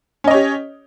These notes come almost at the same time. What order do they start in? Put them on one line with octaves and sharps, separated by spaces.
C#4 D#5 C#5 G4